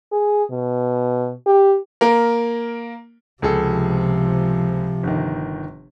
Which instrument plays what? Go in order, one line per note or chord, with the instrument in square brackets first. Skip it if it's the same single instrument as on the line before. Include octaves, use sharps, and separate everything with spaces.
[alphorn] G#4
B2
G4
[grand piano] A#3 A#4
[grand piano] C#2 G#4 A4 [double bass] C3 F3
[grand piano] G1 D#3